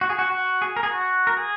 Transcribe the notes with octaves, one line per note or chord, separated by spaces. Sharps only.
F#4
G#4
F#4
F#4
G#4
A#4
G#4
F#4
A#4
G#4